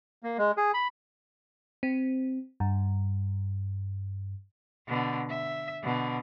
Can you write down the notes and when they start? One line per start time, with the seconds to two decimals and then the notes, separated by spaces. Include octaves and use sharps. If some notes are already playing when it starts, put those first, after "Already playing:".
0.23 A#3
0.38 G#3
0.57 G#4
0.74 B5
1.83 C4
2.60 G2
4.88 B2 D3
5.30 E5
5.83 B2 D3